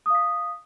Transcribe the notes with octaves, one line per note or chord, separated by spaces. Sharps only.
F5 D#6 B6